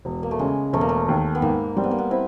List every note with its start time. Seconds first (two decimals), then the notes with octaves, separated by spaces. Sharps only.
0.05 E1
0.23 A#3
0.31 A3
0.39 C#3 G#3
0.73 E1 A3
0.81 A#3
0.89 A3
1.08 D#2
1.35 B3
1.42 G#2 A#3
1.76 G3 C4
1.84 B3
1.91 A#3
1.98 B3
2.10 C4 E4